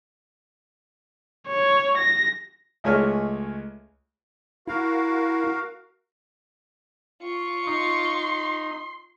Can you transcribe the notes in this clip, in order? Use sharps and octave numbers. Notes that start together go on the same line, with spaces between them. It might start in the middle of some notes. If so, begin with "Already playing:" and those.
C#5
A#6
C#2 A3 G#4 C#5 D#5 F6
E4 F#4 A#4 F5
F4 C#6
D#4 C6